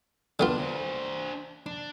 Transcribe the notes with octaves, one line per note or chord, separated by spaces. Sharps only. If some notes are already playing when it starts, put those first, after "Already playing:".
D3 B3 D4 F4
D4 C5
D4